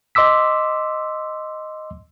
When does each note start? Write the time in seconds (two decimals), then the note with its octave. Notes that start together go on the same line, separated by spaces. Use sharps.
0.15 D#5 C6 D6 E6 B6